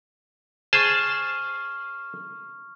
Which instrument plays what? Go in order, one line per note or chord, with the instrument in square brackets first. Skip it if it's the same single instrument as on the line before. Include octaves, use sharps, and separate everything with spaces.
[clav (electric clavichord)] G#4 C5 A5 [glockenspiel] C#6 F6